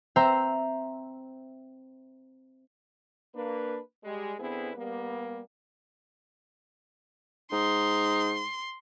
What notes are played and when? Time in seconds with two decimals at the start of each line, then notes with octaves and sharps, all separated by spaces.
0.16 C4 C5 E5 A#5
3.35 A#3 D4 B4
4.04 G3 G#3
4.40 D3 B3 C4 E4 G#4 B4
4.77 G3 A#3 B3
7.52 G#2 D#4 C6